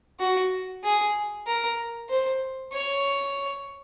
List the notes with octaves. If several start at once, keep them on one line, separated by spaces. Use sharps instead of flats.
F#4
G#4
A#4
C5
C#5